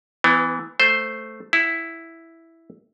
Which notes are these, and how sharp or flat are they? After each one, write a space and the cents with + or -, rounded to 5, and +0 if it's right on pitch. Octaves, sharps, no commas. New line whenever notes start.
E3 -5 B3 +35
A3 +0 C5 +0
E4 +0 F#5 +0